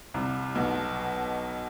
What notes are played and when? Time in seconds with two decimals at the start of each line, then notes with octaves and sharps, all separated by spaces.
0.14 C2 C3
0.55 B1 B2